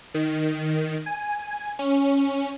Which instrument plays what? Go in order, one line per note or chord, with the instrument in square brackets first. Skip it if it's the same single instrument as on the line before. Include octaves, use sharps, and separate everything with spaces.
[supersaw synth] D#3
G#5
C#4